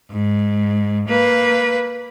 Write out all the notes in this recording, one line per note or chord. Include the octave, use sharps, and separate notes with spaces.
G#2
A#3 B4